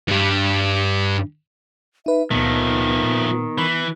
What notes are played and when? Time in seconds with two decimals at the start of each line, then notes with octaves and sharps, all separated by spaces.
0.08 G2 G3
2.06 D#4 B4 E5
2.31 C#2 A#2 D#3 F3 A3 B3
3.03 A#2
3.58 E3 B5